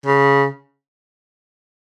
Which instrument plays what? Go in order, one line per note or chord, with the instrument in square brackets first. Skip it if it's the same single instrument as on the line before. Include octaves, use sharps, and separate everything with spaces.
[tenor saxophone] C#3